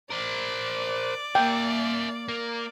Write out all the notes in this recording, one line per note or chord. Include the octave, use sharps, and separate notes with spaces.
A#4 C5 D5
A#3 A#4 E5 G5
A#3